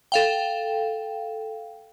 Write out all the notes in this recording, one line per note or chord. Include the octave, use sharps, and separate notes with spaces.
A4 F5 G5